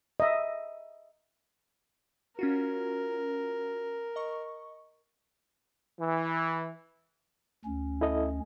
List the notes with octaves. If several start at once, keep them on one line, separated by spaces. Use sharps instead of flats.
D#5 E5
C#4 F4 F#4 A#4
D#5 C#6
E3
D2 C#4
E4 A4 D#5